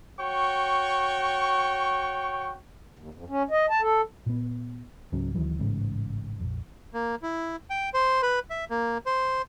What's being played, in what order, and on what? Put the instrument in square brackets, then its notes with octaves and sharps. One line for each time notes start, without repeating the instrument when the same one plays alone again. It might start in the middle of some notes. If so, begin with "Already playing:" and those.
[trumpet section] F#4 C#5 G5 C#6
[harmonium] D#2
F2
C#4
D#5
A5
A4
[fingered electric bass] A#2 B3
C#2 G#2 F#3 C#4
D2 D#3 E3 F#3
A1 G#2 C#3
A#1 F2
[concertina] A#3
E4
G5
C5
B4
E5
A#3
C5